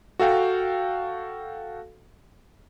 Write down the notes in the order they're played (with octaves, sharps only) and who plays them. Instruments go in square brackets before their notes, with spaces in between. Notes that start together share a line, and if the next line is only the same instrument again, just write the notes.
[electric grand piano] F#4 A4 F5 G5